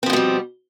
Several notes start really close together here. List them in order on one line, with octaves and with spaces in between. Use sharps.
C4 F3 B2 A3 G3